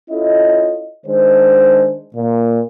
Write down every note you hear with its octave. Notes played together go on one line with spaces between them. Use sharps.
C#4 E4 F4 A4 D#5
D#3 G#3 D4 C5
A#2